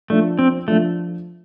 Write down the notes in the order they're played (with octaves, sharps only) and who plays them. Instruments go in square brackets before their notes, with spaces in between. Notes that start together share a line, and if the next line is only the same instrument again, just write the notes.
[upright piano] F3 D4 F4 [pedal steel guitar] A3
[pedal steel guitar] C4
[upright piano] F3 D4 F4 [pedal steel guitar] A3